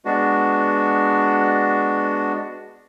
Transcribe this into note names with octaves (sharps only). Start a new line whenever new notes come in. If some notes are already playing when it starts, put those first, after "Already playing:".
G#3 B3 D4 F#4